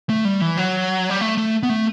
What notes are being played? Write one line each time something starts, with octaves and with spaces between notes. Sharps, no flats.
A3
G3
E3
F#3
G3
A3
A3
B3
A3